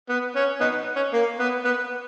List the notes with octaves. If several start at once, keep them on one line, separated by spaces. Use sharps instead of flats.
B3
C#4
B3 D#4
C#4
A#3
B3
B3